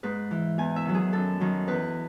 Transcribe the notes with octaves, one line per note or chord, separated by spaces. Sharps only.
G#2 B4
E3
E2 G#5
E5
D#3 F#3
G#4
F#2 A4
D#3 F#3
E2 B4